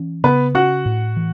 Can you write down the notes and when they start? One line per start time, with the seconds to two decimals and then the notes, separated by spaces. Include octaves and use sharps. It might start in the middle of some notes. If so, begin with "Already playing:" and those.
Already playing: E3 C#4
0.24 C#3 B3 B4
0.55 C#4 F#4 F#5
0.85 A2
1.16 E3